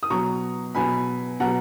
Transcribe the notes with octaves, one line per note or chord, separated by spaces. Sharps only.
D#6
B2 F#3 A#5 C#6
B2 F#3 G#5 B5
B2 F#3 F#5 A#5